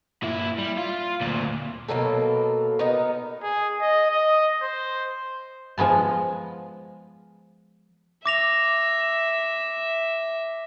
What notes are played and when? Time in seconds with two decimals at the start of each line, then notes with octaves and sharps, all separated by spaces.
0.23 A#2 E4
0.58 G3
0.78 F4
1.21 D2 A#2
1.88 B2 F#3 A#3 A4
2.79 B3 D#4 A#4
3.43 G#4
3.81 D#5
4.10 D#5
4.62 C5
5.78 F3 G#3 B3 A5
8.26 E5 D6 A#6 F7